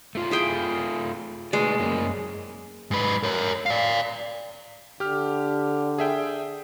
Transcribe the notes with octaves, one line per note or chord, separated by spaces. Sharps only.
A3 F4 F5
E4 G#4 G5
G#3 A3 B4 D5
F#2 A#3 C#4
G#2 B4
A#4 C#5
D5 F5
D3 G4 F6
G#4 E5 G5